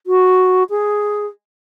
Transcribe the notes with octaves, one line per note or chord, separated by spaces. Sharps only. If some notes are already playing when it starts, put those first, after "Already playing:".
F#4
G#4